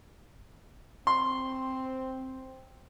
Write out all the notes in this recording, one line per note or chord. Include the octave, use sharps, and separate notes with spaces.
C4 C6